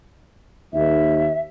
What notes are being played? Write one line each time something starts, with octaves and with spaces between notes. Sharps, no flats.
D#2 E5